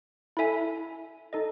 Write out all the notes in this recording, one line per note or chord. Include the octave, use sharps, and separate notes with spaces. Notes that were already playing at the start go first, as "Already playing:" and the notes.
E4 A4 E5 G#5
D#4 A4 D#5